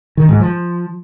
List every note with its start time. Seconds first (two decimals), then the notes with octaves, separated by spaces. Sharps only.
0.17 D#3
0.29 G#2
0.40 F3